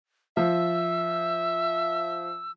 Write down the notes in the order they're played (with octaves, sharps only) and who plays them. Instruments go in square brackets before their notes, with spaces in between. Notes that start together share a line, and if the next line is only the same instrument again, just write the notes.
[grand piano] F3 [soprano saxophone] E5 [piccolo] E6